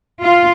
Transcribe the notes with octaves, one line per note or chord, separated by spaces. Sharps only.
F4